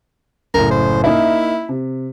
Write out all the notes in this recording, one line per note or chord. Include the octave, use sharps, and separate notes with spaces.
F#1 A2 A#4
C5
A#3 D#4 E4 E5
C3